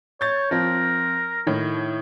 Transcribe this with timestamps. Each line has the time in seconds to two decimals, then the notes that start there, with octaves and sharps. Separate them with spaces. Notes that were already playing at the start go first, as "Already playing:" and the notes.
0.21 C#5 G6 A6
0.51 F3 C4 A#4
1.47 A2 D#3